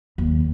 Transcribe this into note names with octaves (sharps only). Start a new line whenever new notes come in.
D#2